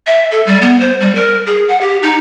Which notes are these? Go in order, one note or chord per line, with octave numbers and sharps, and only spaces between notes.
E5
A4
G3
B3
C5
G3
A#4
G#4
F#5
G4
D#4